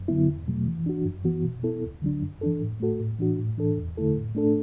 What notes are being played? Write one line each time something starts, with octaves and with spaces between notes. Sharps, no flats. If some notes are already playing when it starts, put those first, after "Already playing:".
Already playing: F#2
D3 F#3 B3 E4
E2
B2 F#3 A3
E3
D4 F#4
F#2
E3 B3 F#4
B2
B3 E4 A4
D2
D3 F#3 D4
F#2
E3 D4 A4
A2
A3 F#4 A4
A2
E3 D4 F#4
A2
E3 D4 A4
E2
D3 A3 E4 A4
A2
A3 D4 A4